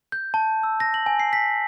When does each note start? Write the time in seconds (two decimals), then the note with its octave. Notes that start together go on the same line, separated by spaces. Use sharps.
0.12 G6
0.34 A5
0.63 E6
0.80 A#6
0.94 F#7
1.06 G#5
1.20 C7
1.33 B6